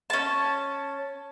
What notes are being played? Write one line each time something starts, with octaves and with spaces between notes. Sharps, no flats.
C#4 A5